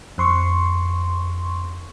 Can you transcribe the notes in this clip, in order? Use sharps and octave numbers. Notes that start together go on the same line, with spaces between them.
F2 C6 C#6